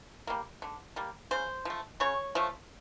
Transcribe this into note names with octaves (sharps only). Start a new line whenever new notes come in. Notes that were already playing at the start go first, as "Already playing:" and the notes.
G3 A#3
D3
G3 A#3
C#3 C5
F3 A3
C#3 C#5
F3 A3